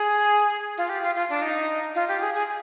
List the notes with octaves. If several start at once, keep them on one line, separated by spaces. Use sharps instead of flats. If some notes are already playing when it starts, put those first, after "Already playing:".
Already playing: G#4
F4
G4
F4
F4
D4
D#4
F4
G4
G#4
G#4